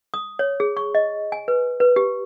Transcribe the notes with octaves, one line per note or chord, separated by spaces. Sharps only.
D#6
C#5
G#4
C#6
D#5
G#5
B4
B4
G4